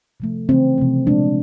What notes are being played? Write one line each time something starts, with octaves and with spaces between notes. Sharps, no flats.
C3 F3 A3
C#3 E3 A3 C4
C3 F3 A3
A#2 F3 G#3 D4